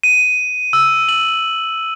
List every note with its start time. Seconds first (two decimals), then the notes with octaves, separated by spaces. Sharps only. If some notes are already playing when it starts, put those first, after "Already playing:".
0.03 D#7
0.73 E6
1.08 F#7